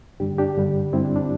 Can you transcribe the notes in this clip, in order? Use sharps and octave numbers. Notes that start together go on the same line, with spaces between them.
G2 D3 G3 D4 G4
D4 G4
G2 D3 G3
G2 D3 G3 C4 E4
D4
D4